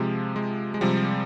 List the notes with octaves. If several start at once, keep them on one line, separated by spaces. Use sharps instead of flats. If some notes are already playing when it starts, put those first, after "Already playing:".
Already playing: C3 F3 G#3
G#3
G#3
C3 F3 G3